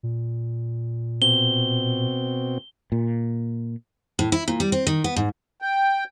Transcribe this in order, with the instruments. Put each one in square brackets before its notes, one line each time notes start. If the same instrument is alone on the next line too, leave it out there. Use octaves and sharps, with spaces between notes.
[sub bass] A#2
[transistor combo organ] B2 C4 [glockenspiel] G7
[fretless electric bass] A#2
[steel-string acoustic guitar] A2
E4
A#2
G3
C4
D#3
B3
G#2
[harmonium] G5